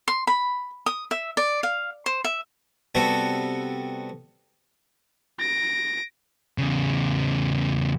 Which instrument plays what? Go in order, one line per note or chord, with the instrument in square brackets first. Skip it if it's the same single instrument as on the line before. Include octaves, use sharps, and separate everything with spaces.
[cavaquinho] C6
B5
D#6
E5
D5
F5
C5
E5
[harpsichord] C3 G3 B3 F#4 A4
[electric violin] A#6 D7
[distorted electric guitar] E2 C#3